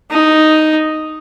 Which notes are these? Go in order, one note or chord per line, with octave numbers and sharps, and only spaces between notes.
D#4